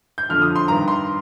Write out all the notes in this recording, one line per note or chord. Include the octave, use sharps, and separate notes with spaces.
G6
F2 D3 F3 F6
D#6
C6
G2 D#3 A#5
C6